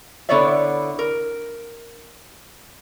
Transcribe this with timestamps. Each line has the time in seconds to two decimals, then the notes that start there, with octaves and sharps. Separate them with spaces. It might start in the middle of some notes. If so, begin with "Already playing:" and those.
0.29 D3 B3 E4 C#5 D5 E5
0.99 A#4